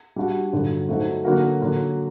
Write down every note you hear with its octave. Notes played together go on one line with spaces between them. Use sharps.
G3 D4 F#4
G2 D3 F#3
F#3 A3 D#4 F#4 C5
D3 F#3 A#3 F#4 A#4
D3 F#3 A#3